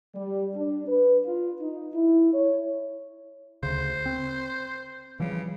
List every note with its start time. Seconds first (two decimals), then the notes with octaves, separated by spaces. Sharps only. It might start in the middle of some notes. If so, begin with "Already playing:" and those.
0.15 G3
0.55 D4
0.87 B4
1.25 F4
1.61 D#4
1.94 E4
2.34 C#5
3.63 D2 C#3 C5
4.06 C4
5.20 C#3 E3 F3 G3